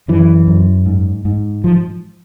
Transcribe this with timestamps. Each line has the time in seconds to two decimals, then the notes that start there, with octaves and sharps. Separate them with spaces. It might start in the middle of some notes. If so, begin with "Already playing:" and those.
0.08 F#2 E3
0.47 F#2
0.86 G#2
1.25 G#2
1.64 F3